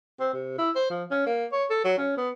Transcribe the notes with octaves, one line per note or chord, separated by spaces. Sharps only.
C4
C3
E4
C5
F3
C#4
A#3
C#5
A4
F#3
C#4
B3